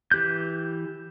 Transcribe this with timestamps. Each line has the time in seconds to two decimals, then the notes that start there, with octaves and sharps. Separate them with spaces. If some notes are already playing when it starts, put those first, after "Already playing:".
0.11 E3 G4 F#6 G6